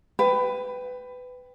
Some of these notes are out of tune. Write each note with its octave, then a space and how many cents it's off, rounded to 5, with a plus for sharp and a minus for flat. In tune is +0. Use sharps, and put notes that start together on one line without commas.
B4 +20 G5 +5